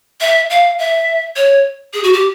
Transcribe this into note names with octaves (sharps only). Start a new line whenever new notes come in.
E5
F5
E5
C#5
G#4
F#4
G4